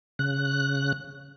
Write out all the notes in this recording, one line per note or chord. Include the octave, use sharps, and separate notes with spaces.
C#3 F#6